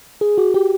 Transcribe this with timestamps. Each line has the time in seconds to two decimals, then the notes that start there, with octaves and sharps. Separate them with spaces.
0.21 G#4
0.38 F#4
0.54 G4